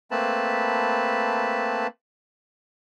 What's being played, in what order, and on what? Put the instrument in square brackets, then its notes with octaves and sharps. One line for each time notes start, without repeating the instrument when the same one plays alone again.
[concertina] A3 A#3 C4 B4 A5 B5